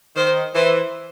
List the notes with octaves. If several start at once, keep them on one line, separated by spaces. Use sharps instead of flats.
D#3 C5
E3 C5